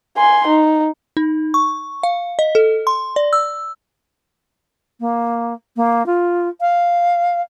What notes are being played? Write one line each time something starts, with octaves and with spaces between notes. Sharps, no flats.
G#5 C6
D#4
D#4
C#6
F5
D#5
A4
C6
D5
E6
A#3
A#3
F4
F5